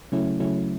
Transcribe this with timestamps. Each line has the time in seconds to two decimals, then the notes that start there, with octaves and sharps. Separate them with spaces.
0.12 C#3 F#3 A3 C#4 E4
0.40 C#3 F#3 A3 C#4 E4